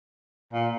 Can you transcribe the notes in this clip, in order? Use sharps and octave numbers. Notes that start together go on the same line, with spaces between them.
A#2